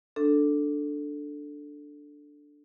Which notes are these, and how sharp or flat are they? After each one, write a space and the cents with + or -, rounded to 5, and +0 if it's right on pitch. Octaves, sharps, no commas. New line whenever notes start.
D4 +0 A4 +0